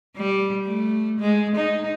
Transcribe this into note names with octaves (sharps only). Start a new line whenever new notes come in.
G3
A3
G#3
D#4